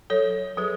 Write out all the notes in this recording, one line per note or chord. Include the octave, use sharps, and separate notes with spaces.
F#3 A4 C#5
F#3 G#4 B4